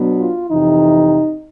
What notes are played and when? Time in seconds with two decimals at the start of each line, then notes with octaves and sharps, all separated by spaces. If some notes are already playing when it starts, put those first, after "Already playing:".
Already playing: B2 F#3 B3 D4
0.20 F4
0.48 F2 C3 E3 D#4